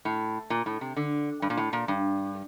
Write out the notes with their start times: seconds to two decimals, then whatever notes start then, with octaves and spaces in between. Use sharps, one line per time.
0.05 A2
0.50 A#2
0.66 A2
0.81 C3
0.97 D3
1.42 G2
1.50 A#2
1.57 A2
1.73 A#2
1.88 G2